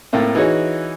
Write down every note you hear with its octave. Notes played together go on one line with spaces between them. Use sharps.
A2 A3 A#3 C4
E3 D#4 F#4 G#4 C#5